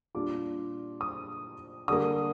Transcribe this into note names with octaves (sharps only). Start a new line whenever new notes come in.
A#2 G3 D4 F4 D6
D#6
D3 G3 A#3 D#6